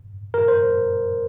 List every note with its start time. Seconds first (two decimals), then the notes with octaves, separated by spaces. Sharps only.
0.34 A#4
0.48 C5